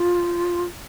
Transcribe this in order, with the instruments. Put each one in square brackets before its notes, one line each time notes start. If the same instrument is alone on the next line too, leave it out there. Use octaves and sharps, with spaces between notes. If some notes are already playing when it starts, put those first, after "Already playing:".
Already playing: [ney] F4